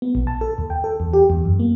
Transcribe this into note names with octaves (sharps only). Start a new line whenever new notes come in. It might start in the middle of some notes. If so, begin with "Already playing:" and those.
B3
A#1
A5
A4
D#2
G5
A4
E2
G4
E2
F#2
A#3